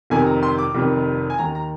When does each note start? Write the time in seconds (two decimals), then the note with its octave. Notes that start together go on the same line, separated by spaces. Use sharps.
0.10 F1 F2 C3 D#3 G#5
0.27 A#5
0.43 C6
0.58 D6
0.75 F1 F2 C3 D#3
1.30 G#5
1.39 D#2 D#3 A#5
1.55 A#5